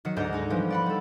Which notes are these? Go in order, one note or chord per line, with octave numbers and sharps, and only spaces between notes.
D#3 F#3 D#6 C#7
D2 G#2 D5 D#5 A#5 G6
G#3 D#4 G#4
E3 F3 G3 B3 G4
D5 F#5 B5
G3 A4